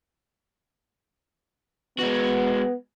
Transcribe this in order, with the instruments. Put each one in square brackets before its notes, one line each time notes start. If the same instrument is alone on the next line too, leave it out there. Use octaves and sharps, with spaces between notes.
[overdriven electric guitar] G#3 F#4 [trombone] B3